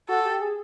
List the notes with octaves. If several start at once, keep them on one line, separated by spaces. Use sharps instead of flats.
F#4 A4
G4
G#4